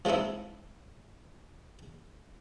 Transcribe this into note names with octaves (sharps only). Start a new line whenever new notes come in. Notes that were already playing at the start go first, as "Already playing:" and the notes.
F3 G#3 C4 D#4 E4